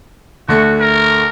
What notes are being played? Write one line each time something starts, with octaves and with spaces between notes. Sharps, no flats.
D2 A3 F#4 C#7
A#4